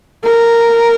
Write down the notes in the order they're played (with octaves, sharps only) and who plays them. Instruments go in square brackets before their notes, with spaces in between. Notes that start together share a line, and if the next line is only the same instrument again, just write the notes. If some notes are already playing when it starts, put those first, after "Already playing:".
[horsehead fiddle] A#4